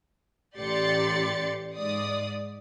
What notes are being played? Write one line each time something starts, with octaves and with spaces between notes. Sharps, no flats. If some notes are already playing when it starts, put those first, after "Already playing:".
A1 G4 D5 C6 A6 C#7
G#2 D5 D#6